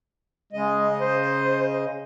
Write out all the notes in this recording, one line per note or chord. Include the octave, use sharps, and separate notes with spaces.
C#3 G#3 D#5
C5